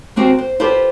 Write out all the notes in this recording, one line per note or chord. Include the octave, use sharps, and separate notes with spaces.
D#2 A#3 C4 F#4 G4
C5
F4 G4 A4 B4 C5 E5